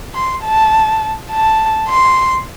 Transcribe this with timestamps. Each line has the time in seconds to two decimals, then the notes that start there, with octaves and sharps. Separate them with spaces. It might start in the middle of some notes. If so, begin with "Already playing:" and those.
0.15 C6
0.44 A5
1.31 A5
1.89 C6